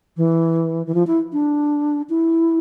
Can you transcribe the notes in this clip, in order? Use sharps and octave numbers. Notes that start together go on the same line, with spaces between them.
E3
E3
F3
E4
D4
E4